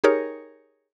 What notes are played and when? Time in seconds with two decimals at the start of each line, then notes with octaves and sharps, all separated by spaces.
0.04 D#4 G4 G#4 A#4 C#5